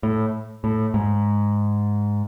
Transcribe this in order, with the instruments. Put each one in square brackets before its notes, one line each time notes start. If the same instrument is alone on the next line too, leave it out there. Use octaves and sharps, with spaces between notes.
[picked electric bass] A2
A2
G#2